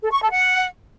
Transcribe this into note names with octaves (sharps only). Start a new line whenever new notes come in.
A4
C#6
A4
F#5